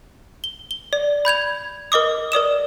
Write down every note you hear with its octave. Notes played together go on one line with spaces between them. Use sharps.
G7
G7
D5
B5 G6 G#6 F7
A#4 D#5 D6 D#6
A#4 D5 D#6 E7